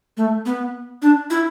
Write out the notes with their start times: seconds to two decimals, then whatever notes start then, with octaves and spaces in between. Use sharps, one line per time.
0.17 A3
0.46 B3
1.02 D4
1.30 E4